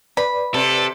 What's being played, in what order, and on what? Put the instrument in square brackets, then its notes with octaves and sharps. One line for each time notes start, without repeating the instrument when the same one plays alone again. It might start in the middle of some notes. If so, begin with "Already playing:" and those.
[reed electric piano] B4 D5 [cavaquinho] B5
[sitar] C3 [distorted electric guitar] A4